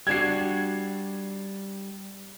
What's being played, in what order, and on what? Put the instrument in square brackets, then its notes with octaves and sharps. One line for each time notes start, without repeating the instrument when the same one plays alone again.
[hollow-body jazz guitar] G3 D4 F#4 [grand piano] G#6 C7